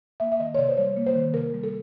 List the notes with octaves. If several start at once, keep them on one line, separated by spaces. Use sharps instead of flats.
A#3 E5
E5
D#3 D#5
C#5
C3 D5
C5
G3 C#5
A#3
C5
D#3
C3 A#4
G3
A4